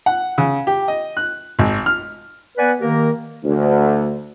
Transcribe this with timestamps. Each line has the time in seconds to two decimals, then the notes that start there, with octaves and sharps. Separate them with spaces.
0.06 F#5
0.38 C#3
0.67 G4
0.88 D#5
1.17 F#6
1.59 G#1
1.86 F6
2.57 B3 B4 D5 F#5 G#5
2.80 D#3 A#3 G4 A#4
3.44 D2